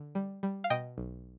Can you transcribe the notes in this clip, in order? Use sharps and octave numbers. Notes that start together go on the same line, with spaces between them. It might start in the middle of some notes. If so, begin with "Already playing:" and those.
Already playing: D3
G3
G3
F5
B2 D#5 G5
B1